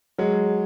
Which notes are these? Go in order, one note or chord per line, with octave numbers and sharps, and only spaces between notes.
F#3 G#3